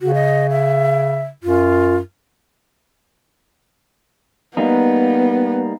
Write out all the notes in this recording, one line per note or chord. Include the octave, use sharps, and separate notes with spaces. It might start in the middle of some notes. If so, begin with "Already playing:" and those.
C#3 F#4
D#5
E5
F#2 F4
G3 A#3 B3 D#4